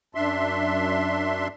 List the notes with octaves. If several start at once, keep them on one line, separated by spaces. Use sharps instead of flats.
F#2 D4 E5 C6